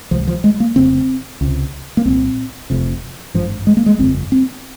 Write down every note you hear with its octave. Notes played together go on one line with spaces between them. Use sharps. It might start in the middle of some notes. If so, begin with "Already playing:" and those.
C#2 C3 F3
F3
G#3
A#3
F1 F2 C#3 C4
C#2 C3
A#3
C2 A#2 C4
F1 F2 C3
G#1 G2 F3
G#3
A#3
G#3
G1 F2 C#3 C4
C4